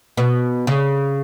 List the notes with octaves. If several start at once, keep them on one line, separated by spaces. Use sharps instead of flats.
B2
C#3